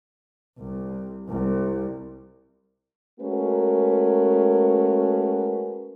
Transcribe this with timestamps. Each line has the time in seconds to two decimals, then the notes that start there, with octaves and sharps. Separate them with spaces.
0.58 C2
1.29 C2
3.19 G#3 A3 C#4 F#4 A#4 B4